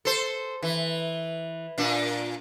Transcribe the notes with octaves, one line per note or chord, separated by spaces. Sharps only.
A4 C5
E3
A#2 D4